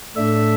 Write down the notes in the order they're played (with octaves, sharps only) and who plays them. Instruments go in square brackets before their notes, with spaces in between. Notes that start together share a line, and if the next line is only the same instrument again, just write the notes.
[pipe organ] A2 A3 D4 E5